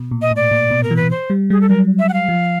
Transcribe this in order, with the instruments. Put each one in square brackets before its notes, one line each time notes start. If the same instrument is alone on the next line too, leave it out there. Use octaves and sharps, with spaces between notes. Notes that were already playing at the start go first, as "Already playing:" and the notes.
Already playing: [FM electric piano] B2
A#2
[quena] D#5
[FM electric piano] A2 [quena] D5
[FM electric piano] A#2
B2
[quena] A#4
[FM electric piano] E3
[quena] B4
C5
[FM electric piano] G3
[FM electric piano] G3 [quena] G#4
[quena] A4
[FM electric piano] F#3 [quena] A#4
[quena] E5
F#5
F5
[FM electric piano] F3